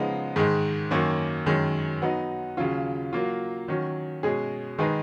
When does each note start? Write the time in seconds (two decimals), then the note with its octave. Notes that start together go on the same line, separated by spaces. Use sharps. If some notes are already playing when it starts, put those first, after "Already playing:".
Already playing: C#3 F3 G#3 B3 D#4
0.36 G#2 D#3 G#3
0.91 F#2 D#3 A#3 C#4
1.46 F#2 D#3 G#3 C#4
2.02 F#3 B3 D#4
2.57 D#2 C#3 F#3 C#4 F4
3.13 F#3 A#3 F4
3.68 D#3 F#3 C#4
4.23 B2 G#3 C#4 G#4
4.78 D#3 G#3 D#4 G#4 B4